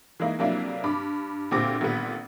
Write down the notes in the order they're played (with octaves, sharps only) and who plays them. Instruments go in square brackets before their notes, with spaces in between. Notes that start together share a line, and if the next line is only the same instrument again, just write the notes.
[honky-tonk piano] E3 G#3 A#3 D#4 E4
F2 C3 F#3 A#3 D4 E4
G2 B5 D6
D2 A#2 C4 G4 D6 A#6
G#1 A#2 D3 G3 B3